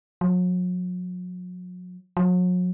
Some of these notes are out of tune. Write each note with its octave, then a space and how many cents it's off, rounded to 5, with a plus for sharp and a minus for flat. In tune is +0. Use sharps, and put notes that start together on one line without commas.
F#3 -40
F#3 -40